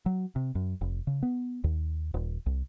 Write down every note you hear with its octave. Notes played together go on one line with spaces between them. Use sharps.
F#3
C3
F#2
F1
C#3
B3
D#2
D#1
C2